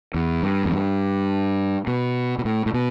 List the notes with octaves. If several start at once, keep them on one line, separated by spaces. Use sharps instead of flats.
E2
G2
E2
G2
B2
B2
A2
A2
B2